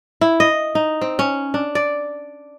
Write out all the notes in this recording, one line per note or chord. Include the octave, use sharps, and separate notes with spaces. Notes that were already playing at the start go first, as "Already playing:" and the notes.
E4
D#5
D#4
C4
C#4
D4
D5